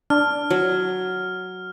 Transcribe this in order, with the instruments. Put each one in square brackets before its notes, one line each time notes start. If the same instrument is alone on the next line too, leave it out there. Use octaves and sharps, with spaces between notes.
[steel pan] D4 [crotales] F6
[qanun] F#3